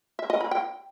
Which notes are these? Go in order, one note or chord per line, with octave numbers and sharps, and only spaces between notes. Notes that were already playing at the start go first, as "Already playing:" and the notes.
E5
D#5
B5
G5